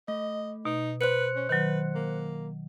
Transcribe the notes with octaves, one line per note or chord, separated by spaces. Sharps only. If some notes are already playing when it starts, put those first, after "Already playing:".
A3 D#5
B2 D#4
B4 C5 F#6 C#7
C#4
D#3 F#3 B4
A#3